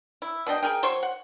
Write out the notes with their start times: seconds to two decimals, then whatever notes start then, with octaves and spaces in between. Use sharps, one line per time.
0.22 E4
0.47 B2 D4 D#5 G5
0.63 G#4 A#4 G5
0.83 F#3 C5 C#5 C#6
1.03 F#5